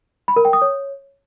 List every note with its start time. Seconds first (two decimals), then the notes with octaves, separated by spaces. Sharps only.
0.28 B5
0.36 A#4
0.45 G5
0.53 D#6
0.62 C#5